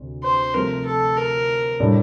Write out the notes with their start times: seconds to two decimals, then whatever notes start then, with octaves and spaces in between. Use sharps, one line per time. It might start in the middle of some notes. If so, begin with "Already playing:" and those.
Already playing: D2 C3
0.23 C5
0.54 C3 F3 A3 A#4
0.85 A4
1.17 A#4
1.80 A2 G3 D4